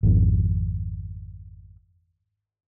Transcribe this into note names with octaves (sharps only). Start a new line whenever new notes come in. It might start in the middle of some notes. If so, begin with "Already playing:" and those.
G#1 F2